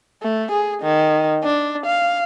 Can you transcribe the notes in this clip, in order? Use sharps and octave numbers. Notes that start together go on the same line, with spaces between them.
A3
G#4
D#3
D4
F5